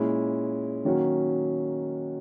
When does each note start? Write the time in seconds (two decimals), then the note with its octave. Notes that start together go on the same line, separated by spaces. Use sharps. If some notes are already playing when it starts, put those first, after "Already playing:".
Already playing: A#2 G#3 C#4 E4
0.85 D#3 F#3 A#3 C#4 F#4